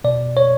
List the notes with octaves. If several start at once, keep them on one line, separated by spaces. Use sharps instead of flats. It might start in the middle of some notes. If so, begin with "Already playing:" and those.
B2 D5
C#5